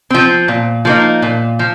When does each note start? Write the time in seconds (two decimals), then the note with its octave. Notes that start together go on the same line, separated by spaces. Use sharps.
0.10 F3 C4
0.48 A#2
0.85 F3 A#3 D#4
1.22 A#2
1.59 F3